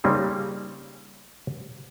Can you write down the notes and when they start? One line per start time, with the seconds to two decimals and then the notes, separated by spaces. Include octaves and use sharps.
0.04 C#3 G3 A#3 C4 D#4